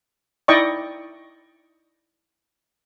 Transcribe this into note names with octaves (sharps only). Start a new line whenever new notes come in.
D#4 E4 D5 D#5 G5 C#6